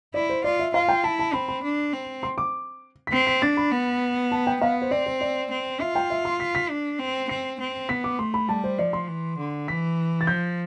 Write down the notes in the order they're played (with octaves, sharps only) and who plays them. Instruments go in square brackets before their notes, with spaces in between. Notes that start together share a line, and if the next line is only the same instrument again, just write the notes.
[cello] E4 [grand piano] D5
[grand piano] C5
[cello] F4 [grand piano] D5
[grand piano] E5
[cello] F4 [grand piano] F5
[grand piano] G5
[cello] E4 [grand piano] A5
[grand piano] A5
[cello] C4 [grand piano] B5
[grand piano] B5
[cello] D4
C4
[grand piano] C6
D6
B6
[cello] C4 [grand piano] C7
[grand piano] B6
[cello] D4 [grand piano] A6
[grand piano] B5
[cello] B3
[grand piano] A5
G5
[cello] B3 [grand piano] F5
[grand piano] C5
[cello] C4 [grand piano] D5
[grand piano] C5
D5
[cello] C4
[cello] F4 [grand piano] E5
[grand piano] G5
E5
C6
B6
B6
[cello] D4
C4
[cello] C4 [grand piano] C7
[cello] C4
[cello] B3 [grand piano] B6
[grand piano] D6
[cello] A3 [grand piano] C6
[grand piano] B5
[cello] G3 [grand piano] A5
[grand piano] C5
[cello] F3 [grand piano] D5
[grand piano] C6
[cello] E3
D3
[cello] E3 [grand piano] B6
[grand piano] A6
[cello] F3 [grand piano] G6